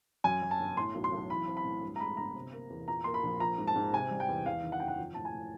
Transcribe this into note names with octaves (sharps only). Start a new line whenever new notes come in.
F#2 G#5
F#3
A5
G1
A2 C6
B1
C6
B1
E3 B5
C4
B5
A2
G2
A#5
G#3 B5
G1 A#5
C3
A#3
E2
A#2 A#5
A#3 C6
B5
A#1
F3 A#5
G#2
A5
G#2
C3 G#5
G3
G5
E2
E2 F5
D#3
F#5
F#1 G5
F#5
F3
A2 A5
G#5
A2